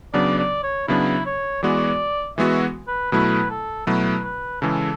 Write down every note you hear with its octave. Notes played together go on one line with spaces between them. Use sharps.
C#3 F#3 B3 D4 D5
D5
C#5
C#3 F#3 B3 D4 E4
C#5
E3 G#3 B3 F#4 D5
E3 G#3 B3 F#4 E5
B4
B2 F#3 A3 E4 B4
A4
B2 F#3 A3 E4 B4
B4
C#3 E3 G#3 A4